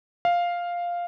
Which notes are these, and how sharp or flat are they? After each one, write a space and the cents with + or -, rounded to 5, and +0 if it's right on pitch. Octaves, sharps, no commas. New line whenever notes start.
F5 +0